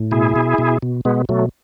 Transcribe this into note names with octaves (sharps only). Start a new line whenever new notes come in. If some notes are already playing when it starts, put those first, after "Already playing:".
Already playing: A2
B2 E4 G#4
B2
B2
B2
B2 G#3 B3
B2 F#3 A3